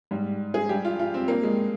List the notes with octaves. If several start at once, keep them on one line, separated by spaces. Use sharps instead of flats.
G#2 G3
G#4
G2 G3 G4
F4
F4
C4
G2 G3 A#3
G#3